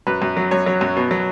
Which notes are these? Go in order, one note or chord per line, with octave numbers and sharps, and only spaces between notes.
F#2 B4
F#2
F#3
F#2 C#5
F#3
F#2
B2
F#3